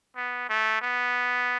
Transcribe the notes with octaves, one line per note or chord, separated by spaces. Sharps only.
B3
A3
B3